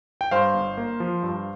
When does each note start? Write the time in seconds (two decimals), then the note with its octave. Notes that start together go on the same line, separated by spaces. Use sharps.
0.21 G5
0.31 G2 C5 F5
0.54 G1
0.77 A#3
1.00 F3
1.23 G2